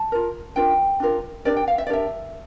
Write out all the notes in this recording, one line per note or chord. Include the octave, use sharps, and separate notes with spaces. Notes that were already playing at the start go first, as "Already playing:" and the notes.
Already playing: A5
F4 A#4
D4 F4 A#4 G5
D4 F4 A#4
D4 G4 A#4 D5
G5
F5
E5
D5
D4 G4 A#4 E5